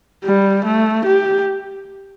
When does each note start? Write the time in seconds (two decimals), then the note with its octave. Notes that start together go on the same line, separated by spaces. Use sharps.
0.25 G3
0.65 A3
1.06 G4